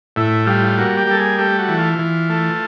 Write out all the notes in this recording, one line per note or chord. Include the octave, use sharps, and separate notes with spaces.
A2 E4
G3 F4
F4
A#3 F#4
G4
G3 A4
G#4
A3 G4
F#4
E3
F4
E3
A3